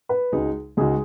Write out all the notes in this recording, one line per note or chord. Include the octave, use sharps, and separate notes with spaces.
B4
C#2 C#3 G#3 D#4 F#4 G#4
C#2 C#3 G#3 D#4 F#4 G#4